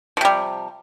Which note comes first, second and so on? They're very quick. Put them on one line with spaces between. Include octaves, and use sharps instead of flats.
F3 C3 G3